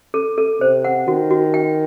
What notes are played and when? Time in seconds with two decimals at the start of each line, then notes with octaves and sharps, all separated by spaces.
0.14 A4
0.38 A4
0.60 C3 C5
0.85 F#5
1.07 D#3 F#4
1.31 F#4
1.54 G5